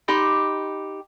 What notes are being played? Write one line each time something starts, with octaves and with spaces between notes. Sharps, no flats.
D#4 G4 B5 C6